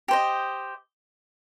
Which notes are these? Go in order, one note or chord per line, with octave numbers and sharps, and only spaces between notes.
G4 C5 D#5